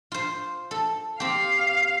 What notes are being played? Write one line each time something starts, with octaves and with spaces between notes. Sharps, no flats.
F4 C5
A4
C4 G4 F5